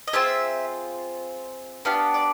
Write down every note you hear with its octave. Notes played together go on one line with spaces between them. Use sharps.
D#5
C4 F4 G#4 E5
B3 D4 G4 F5
D5